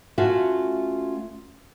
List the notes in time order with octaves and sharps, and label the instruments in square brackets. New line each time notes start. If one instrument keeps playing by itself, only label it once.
[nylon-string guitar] A3 C#4 F4 F#4 E5 F5